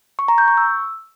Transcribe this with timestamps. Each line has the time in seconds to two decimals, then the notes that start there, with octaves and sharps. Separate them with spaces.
0.19 C#6
0.28 A#5
0.38 G6
0.48 C#6
0.57 E6